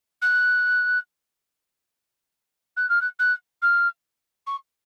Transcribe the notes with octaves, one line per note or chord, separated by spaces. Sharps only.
F#6
F#6
F6
F#6
F#6
F6
C#6